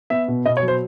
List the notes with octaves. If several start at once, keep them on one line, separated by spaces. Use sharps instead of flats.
B3 E5
B2
B2 D#5
C#5
F#3
C5